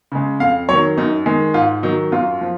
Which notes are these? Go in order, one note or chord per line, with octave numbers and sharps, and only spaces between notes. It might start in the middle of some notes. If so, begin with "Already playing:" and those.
C#3 G#3
F2 F5
D#3 F#3 C#5
F#2 D#4
D#3 G#3
G#2 F4
D#3 F#3 D#4
F#2 F4
F3